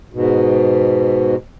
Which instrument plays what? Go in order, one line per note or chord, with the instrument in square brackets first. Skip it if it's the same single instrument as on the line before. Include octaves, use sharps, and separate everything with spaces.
[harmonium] G#2 B2